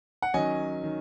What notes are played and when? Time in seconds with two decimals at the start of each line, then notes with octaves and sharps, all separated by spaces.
0.22 F#5
0.34 D#3 F#3 C#4 D#5 G#5
0.84 D#3